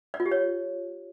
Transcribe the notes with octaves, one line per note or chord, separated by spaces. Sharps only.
D5
F4
G4
C#5